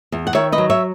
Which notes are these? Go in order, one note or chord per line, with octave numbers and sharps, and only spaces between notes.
E2
F#5
D#3 C#5 E5
B4 D#5
F#3
C#5 E5